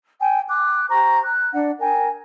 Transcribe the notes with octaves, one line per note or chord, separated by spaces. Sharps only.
G5 G#5
D6 F#6
G4 C5 A#5 C#6
F#6
D4 D5 F#5
A#4 G5 G#5